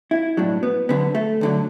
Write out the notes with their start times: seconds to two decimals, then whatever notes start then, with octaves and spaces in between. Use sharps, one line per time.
0.11 E4
0.37 B1 A2 F#3 D4
0.63 B3
0.89 D2 D3 F#3 B3
1.15 A3
1.41 D2 D3 F#3